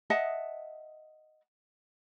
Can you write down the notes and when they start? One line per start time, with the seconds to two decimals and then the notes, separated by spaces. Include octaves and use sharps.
0.10 D#5 E5 F#5 A5